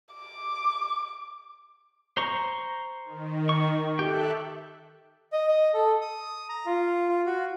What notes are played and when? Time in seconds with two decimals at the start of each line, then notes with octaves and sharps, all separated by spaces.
0.15 D6
2.17 C5 A#5 C#6
3.05 D#3
3.49 C#6
3.99 G4 A4 E5 G5 F#6
5.32 D#5
5.48 D#5
5.74 A4
6.01 D#6
6.49 A#5
6.66 F4
7.09 F4
7.26 F#4